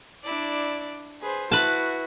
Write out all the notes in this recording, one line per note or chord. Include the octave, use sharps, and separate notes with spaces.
D4 E4 D5
G#4 B4 C5
E4 F#4 B4 A5